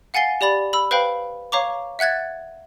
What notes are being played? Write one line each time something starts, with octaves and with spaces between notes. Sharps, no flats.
F5 F#5 G#5 A6 C7 G7
G4 D5 B5 A6
B5 E6
B4 C5 F5 G5 B5
C#5 F5 A#5 C#6 D6
E5 F#5 F#6 G#6 A6